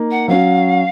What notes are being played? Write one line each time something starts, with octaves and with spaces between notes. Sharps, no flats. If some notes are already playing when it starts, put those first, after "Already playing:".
Already playing: A#3 D#4
F#5
F#3 C#4 F#4 F5